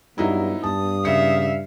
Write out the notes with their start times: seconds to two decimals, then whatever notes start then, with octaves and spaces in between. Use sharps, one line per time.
0.18 G2 F#3 B3 D#4 E4
0.63 G2 A5 D#6
1.05 C#3 E5 F5 C#7